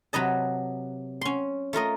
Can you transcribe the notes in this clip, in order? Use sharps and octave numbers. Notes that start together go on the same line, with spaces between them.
C3 F#3 B4 D#5 A5
C#4 C6
A3 F4 A#4 D#5